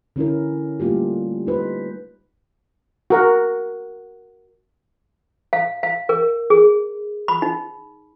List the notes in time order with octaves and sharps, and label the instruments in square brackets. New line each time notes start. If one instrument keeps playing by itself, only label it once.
[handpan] D3 C#4 E4 A#4
G3 A3 A#3 F4 G4
D#4 B4 C5
[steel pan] F#4 A#4 F#5
[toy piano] F5
F5
A#4
G#4
B5
D#4